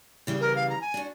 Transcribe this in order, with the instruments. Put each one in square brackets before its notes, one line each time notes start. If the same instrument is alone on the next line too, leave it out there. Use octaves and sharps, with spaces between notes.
[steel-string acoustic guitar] C#3 E3 G3
[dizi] A#4
F5
A#5
G#5
[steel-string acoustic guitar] D4 F#4